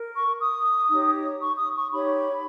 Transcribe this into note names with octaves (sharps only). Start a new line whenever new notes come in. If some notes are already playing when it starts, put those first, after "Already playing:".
Already playing: A#4
C#6
D#6
D#4 G4 C#5
C#6
D#6
C#6
D#4 G4 C#5 B5